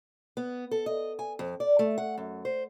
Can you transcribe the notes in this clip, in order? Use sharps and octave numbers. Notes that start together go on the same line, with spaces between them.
B3
A4
D#5
G#5
F2
D5
A3
F#5
F#2
C5